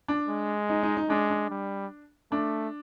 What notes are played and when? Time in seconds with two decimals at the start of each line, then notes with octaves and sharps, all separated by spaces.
0.08 D4
0.28 G#3
0.69 D#4
0.83 D#4
0.97 D#4
1.09 G#3 D4
1.30 D4
1.50 G3
2.32 A3 D4